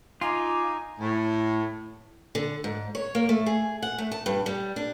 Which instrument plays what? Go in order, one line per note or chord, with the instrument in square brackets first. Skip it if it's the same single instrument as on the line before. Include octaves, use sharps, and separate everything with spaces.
[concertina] D#4 [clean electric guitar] F4 [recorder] G#5 [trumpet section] D6
[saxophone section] A2
[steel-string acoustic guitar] D3
G#2
C#5
A#3
A3
G#4
F#5
A3
A5
G2
G3
D4